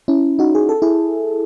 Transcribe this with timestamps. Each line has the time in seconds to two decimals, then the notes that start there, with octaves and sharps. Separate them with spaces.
0.08 C#4 E4
0.39 D#4 F#4
0.55 G#4
0.69 A4
0.82 E4 G#4